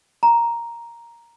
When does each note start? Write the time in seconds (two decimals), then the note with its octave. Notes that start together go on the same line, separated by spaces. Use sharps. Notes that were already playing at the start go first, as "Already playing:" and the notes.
0.23 A#5